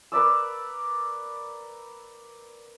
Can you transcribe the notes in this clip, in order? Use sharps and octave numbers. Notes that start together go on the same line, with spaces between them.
A#4 B4 D5 E6